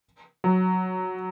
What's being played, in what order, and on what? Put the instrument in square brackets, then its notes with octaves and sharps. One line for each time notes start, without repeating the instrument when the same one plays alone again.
[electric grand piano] F#3